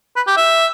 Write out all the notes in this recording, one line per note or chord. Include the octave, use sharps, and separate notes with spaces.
B4
G4
E5